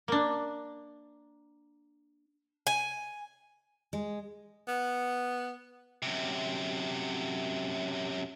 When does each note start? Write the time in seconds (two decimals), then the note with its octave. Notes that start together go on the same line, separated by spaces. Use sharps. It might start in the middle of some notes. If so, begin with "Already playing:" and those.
0.08 A#3 D4
2.67 G#5
3.93 G#3
4.68 B3
6.02 F#2 C3